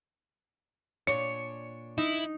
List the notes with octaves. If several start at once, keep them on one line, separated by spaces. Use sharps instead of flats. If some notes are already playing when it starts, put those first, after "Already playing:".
A#2 D4 C#5 C#7
D#4 E4